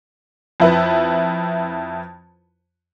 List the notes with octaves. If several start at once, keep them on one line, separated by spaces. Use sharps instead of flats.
F2 E4 B4